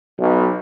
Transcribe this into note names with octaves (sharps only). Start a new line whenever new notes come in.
B1